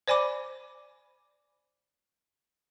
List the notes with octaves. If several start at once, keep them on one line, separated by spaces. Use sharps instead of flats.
C5 D5 G#5 B5 D6